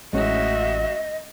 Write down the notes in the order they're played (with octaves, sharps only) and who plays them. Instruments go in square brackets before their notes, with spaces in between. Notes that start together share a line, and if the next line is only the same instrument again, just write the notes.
[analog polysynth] A1 [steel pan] G#3 C#4 [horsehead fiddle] F#4 E5 [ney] D#5